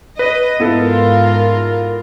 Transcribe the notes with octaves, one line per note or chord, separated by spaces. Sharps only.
B4 D#5
G#2 B3 E4 F4 A4 A#4